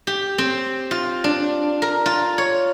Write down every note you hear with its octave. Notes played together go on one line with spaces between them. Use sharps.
G4
C4
F4
D4
A#4
F4
C#5